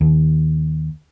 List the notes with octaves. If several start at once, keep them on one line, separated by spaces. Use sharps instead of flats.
D#2